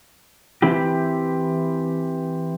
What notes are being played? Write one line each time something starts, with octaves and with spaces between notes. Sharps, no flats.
E3 C4 E4 G4